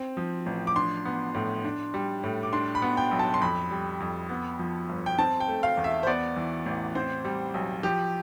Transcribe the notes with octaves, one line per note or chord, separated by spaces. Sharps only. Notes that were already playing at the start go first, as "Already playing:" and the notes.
Already playing: C4
F3
A1
D6
D4 C6
B3
A2
D4
G3
A2
D6
D4 C6
B5
B3
G5
B1
A5
C6
F2 B5
G3
F2
B3
F3
G1
G5
C4 A5
G5
A3
F5
E2
E5
C5
B3 D5
E3
A1
C4 C5
G3
B1
F3 G4